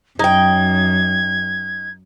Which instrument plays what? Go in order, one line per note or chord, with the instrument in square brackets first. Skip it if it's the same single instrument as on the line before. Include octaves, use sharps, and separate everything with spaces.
[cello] F#2 [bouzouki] D#4 G5 [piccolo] G#6